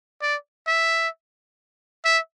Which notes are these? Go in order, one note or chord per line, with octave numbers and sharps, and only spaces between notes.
D5
E5
E5